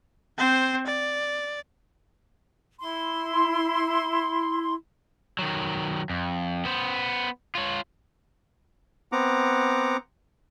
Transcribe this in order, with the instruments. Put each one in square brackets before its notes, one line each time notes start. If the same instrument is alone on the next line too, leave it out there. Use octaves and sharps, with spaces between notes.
[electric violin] C4 C5
D5
[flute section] E4 C6
[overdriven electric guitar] D#3 F#3
F2
B3 C5
F4 C#5
[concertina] B3 C4 F#5 A#5 D6